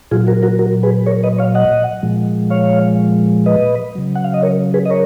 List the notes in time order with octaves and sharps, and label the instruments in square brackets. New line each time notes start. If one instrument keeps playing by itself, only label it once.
[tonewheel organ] A#2 F#3 F4 G#4
F#4 A#4
F#4 A#4
F#4 A#4
G#4 B4
A#4 C#5
B4 D#5
C#5 F5
D#5 F#5
A#2 F3 G#3
C#5 F5
B4 D#5
C#3 F#3
F#5
F5
D#5
A#4 C#5
G#4 B4
D#5
A#4 C#5